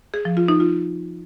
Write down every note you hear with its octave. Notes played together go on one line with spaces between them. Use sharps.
G#4
F3
F4
D#4
F4